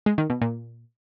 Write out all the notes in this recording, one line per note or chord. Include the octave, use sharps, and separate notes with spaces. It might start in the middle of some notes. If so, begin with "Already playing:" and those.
G#3
D#3
B2
A#2